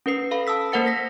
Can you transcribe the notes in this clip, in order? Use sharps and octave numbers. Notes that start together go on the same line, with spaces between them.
C#4 A#4 B4 C7
A4 F5 B5
A5 D#6 E6 B6
A#3 A#4 C5 F#5 A6 C#7
A#4 A#6 B6